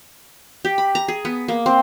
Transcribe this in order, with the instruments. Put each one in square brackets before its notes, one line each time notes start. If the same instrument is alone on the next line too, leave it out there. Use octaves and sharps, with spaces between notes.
[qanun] G4
B5
A#5
G#4
B3
A#3
C4